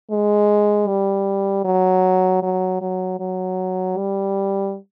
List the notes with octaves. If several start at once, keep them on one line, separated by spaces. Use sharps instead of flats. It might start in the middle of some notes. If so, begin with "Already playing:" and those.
G#3
G3
F#3
F#3
F#3
F#3
G3